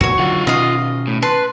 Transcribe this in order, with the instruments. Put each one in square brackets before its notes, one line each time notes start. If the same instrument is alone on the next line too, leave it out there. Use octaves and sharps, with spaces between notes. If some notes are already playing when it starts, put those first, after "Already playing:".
[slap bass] F2 A#2 [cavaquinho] F#4 C#5
[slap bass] D3 F#3 [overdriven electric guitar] F4 F#5
[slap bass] B2 D#3 C#4 [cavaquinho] D#5 F5
[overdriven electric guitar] A2
[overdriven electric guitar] B4 [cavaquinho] A5 C6